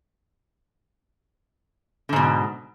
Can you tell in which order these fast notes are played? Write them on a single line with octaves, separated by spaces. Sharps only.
D3 G#2 B2